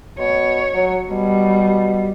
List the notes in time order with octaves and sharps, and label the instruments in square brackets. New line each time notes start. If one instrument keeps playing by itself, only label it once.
[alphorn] B2 [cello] C#5
[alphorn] F#3
[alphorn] B2 [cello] G3